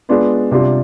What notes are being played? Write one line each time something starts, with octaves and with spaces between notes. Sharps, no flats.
G#3 B3 D4 F4 B4
C3 G3 D4 F4